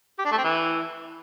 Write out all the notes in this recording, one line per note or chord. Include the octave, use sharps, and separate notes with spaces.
G4
D4
A3
C4
E3